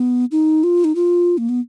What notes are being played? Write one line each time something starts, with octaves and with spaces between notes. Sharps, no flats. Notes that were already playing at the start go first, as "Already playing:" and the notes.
Already playing: B3
D#4
F4
D#4
F4
A#3
B3